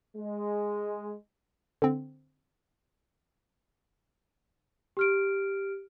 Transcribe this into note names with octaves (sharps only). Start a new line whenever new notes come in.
G#3
D3 C4
G4 F6 D7